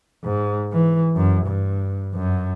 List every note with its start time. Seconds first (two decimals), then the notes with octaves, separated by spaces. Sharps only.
0.23 G#2
0.72 E3
1.16 F#2
1.47 G2
2.15 F#2